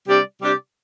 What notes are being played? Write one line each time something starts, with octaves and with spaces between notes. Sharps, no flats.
C3 G3 D4 G4 D5
C3 G3 D4 G4 D5